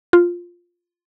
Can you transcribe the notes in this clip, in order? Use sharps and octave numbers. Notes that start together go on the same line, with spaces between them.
F4